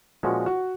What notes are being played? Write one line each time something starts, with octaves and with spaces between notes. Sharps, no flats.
A#2 F3 G#3 C#4 F#4
F#4